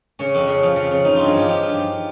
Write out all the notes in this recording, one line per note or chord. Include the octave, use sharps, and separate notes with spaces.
C#3 C#4
F2
C#3
F3
C#3
C#3
F3 D#4
G2 F4
G#4
F3 G4
F3 G4
G2
F3